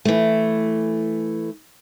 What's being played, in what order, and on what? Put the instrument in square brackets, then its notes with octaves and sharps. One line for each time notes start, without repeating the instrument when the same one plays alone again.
[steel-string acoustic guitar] E3 A3